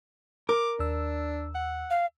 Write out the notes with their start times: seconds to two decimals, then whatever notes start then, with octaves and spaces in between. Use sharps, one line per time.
0.49 A#4 D6
0.79 D#2 D4 E6
1.55 F#5
1.90 F5